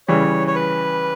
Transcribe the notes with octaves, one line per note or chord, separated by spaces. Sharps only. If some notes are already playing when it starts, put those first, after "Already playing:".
C#3 E3 G3 C#5
C#5
B4